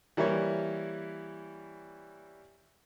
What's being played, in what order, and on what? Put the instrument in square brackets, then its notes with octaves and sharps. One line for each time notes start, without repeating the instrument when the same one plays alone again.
[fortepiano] E3 G3 A#3 E4 C#5